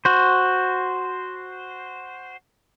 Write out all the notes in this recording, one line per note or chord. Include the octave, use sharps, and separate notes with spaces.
F#4 C5